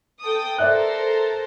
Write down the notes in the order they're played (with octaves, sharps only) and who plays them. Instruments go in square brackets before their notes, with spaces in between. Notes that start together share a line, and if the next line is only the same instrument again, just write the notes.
[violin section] A4 G5 D#6
[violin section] A4 A#4 C5 [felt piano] D5 E5 F#6